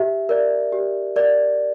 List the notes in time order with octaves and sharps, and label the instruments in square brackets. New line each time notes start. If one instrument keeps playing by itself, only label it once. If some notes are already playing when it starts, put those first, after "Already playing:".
Already playing: [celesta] G4 E5
A#4 D5
G4
A#4 D5